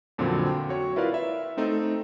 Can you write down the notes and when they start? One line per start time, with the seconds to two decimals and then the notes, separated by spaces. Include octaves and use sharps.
0.18 F2 A#2 D3 F#3 C4
0.46 G5
0.69 F#4 C#5
0.96 E4 F4 A#4 B4 D5 F5
1.14 E5
1.57 A3 C4 D#4 A4